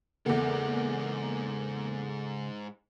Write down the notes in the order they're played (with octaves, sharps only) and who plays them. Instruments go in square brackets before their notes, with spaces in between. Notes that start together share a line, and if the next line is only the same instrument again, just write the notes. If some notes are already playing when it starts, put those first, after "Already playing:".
[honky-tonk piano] E2 A#3 [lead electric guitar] G#2 F#5 [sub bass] C#3 [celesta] A4